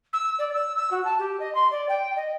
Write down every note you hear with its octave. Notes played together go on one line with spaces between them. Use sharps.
E6
D5
E6
E6
F#4
A5
G4
D#5
C6
D5
G5
D#5